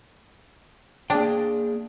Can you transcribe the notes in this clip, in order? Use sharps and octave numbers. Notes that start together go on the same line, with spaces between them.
A#3 D4 G#4 G5